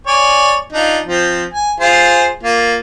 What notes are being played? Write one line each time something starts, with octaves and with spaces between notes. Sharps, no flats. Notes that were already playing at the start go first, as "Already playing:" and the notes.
C#5 D5 G#5
D4 D#4 F4
F3 C4
G#5
F4 G#4 C5
A#3 F4